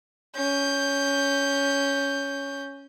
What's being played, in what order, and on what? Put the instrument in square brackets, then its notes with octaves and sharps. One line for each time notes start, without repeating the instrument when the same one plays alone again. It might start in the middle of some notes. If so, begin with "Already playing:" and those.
[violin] C#4 G6